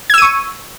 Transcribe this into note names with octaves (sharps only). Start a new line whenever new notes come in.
C#6 E6 G#6 D#7